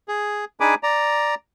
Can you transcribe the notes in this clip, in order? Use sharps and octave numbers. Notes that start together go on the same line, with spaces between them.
G#4
D4 D#4 G#4 G#5 B5 D6
D5 A#5